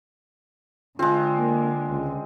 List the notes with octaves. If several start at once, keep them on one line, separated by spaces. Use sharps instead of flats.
D3 G#3 C4 F4
A#3
C#2